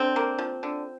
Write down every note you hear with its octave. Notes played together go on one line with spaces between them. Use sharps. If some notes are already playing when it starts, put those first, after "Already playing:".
Already playing: D3 C4
A#3
F3
D3